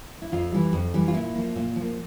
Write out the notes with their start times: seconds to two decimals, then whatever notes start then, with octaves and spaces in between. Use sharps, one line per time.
0.22 E4
0.32 F2 F4
0.52 E3 G3
0.73 F2
0.94 E3 G3
1.08 F4
1.14 A#2 E4
1.35 F3 A#3
1.56 A#2
1.76 F3 A#3